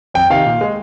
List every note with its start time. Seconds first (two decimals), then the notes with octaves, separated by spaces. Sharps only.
0.14 F2 G5
0.30 C3 D#3 F5
0.46 A#2
0.61 G#3